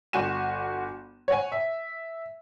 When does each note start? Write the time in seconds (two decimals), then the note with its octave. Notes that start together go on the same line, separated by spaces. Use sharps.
0.13 G1 F#4 G#5 E7
1.28 C#5 F#5 G#5
1.52 E5